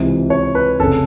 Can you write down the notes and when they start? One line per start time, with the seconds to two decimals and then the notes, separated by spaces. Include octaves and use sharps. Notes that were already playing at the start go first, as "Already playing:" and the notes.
Already playing: C#2 C3 E3
0.30 C#5
0.55 B4
0.79 F1 C#3 A4